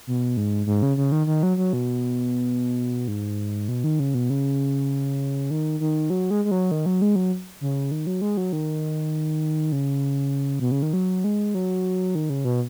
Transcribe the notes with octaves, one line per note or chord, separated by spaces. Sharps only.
B2
G#2
G#2
C#3
C#3
D#3
D#3
F#3
F#3
B2
G#2
B2
D#3
C#3
B2
C#3
D#3
D#3
F#3
G#3
G#3
F#3
D#3
F#3
G#3
F#3
C#3
D#3
F#3
G#3
F#3
D#3
C#3
B2
C#3
D#3
F#3
G#3
F#3
D#3
C#3
B2